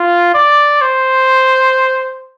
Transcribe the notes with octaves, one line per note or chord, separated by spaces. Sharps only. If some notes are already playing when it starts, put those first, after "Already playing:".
Already playing: F4
D5
C5